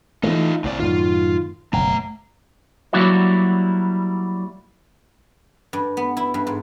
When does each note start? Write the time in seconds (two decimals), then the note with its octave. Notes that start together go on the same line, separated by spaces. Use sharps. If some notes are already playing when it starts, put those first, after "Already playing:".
0.23 E3 F3 A3 D#4 F4
0.64 C2 A2 D5
0.80 F#2 A2 D#3 F4
1.73 F#1 B1 A3 A#5
2.93 F#3 G3 A#3 E4 F#4 D5
5.73 G2
5.97 B3
6.17 E4
6.34 G2
6.47 G#2